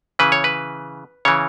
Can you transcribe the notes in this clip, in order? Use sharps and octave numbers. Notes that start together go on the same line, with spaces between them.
C#3 E3 B4
C#5
B4
C#3 E3 C#5